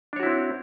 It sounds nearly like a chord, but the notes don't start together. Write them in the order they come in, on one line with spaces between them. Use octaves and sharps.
D4 C#5 F#4 E4 C4